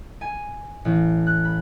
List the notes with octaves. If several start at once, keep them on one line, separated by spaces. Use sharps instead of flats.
G#5
A1
F#6
B5